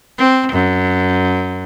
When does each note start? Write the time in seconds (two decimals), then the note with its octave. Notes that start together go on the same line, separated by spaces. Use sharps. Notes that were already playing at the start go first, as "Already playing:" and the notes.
0.18 C4
0.53 F#2